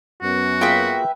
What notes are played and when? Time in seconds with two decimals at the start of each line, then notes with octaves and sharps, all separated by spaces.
0.22 F#2 B3 F#4
0.61 A#3 F4 G#4 B4 E5 G5